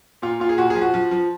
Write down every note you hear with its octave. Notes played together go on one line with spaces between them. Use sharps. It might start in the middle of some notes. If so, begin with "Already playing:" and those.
A#2 F4
A#2 F4
G#4
A#2 F#4
G#4
F3
F#4
F3
F3